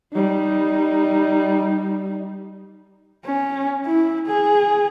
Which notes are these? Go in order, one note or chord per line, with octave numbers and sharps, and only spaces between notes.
G3 D#4
C#4
E4
G#4